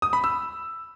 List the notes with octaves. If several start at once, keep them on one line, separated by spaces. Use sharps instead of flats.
D#6
B5
E6